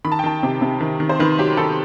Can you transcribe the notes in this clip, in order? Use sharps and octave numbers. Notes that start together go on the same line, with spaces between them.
D#3 B5
A5
G5
D#3 A5
C3
C3
D#3
D#3
C5
D#3 B4
F#3 G4
D#3 A4